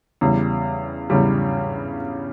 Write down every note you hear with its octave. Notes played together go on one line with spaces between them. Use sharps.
E2 C#3 G3
E2 C#3 G3